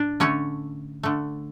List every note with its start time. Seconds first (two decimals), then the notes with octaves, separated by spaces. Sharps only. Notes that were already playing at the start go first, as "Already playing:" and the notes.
Already playing: A2 D4 D5
0.20 D3 A3 C#4 C#5
1.03 D3 A3